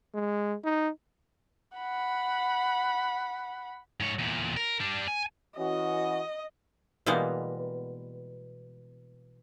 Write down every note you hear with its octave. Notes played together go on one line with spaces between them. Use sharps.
G#3
D#4
F#5 B5
G#2 C#5
E2 A#2
A#4
G3 D4
G#5
E3 C#4 F#4 D#5
B2 E3 G3 G#3 A#3 B3